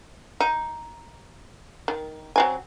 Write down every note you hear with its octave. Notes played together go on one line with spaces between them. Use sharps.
D#4
D#3
F#3 C4 G#5